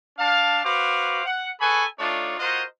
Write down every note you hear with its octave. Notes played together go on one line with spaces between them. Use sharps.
D4 F5 A5
F#4 B4 C5 F5 D6
F#5
G#4 A4 B4 G#5 B5 C#6
A3 D4 D#4 F4 C#5 D5
F4 F#4 A#4 C5 D#5 F#5